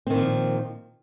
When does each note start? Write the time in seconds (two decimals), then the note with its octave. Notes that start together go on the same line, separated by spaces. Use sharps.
0.07 C4
0.10 D#3
0.14 A#2
0.17 F3